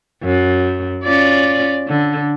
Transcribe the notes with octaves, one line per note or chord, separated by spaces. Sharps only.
F#2
C#4 F4 D5
D3